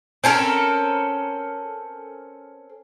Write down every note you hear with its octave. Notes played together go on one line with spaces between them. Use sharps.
C4 C#4 A4 A#4